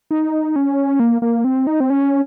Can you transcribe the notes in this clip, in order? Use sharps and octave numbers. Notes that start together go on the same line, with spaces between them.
D#4
C#4
A#3
A#3
C4
D#4
C4
C#4